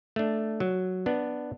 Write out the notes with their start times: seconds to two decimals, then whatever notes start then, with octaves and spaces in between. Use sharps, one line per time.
0.16 A3 D4
0.60 F#3
1.06 B3 D4